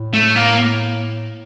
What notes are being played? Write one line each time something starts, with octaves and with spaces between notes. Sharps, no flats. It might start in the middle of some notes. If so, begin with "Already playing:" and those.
Already playing: A2
A3
A#3